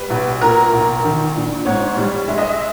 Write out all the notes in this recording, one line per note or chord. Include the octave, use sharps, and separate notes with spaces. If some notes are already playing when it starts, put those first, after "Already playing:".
Already playing: G3 B4
B1
A#2 A#4
B1
D#3
A#1
G#2 C#5
G3
G#3 E5
D#5
E5